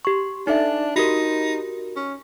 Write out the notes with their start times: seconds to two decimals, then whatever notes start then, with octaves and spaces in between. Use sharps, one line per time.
0.05 G4 C#6
0.47 D4 D#4 A4 E5
0.96 D#4 F#4 G4 A#4
1.96 C#4